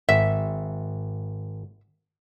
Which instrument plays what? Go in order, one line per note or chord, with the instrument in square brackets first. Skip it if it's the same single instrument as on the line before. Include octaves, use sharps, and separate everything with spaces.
[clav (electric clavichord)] G#1 [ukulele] E5